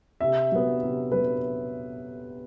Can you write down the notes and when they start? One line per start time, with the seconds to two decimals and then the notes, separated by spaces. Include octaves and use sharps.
0.20 C3 E5
0.52 F#3 B3
0.83 C3
1.12 F#3 B3 B4